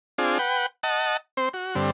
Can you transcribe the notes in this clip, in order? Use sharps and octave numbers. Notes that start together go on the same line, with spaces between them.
C4 D4 F4 G#4
B4 F#5 G5
D#5 F#5 A5
C4 C5
F#4
G2 D3 C4